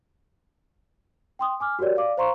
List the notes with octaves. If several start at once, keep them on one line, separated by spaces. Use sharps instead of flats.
G5 C6 D#6
G#5 D6 F6
F#4 G4 A#4 C#5 D5
D5 F5 D6
C5 F5 A#5 C6 C#6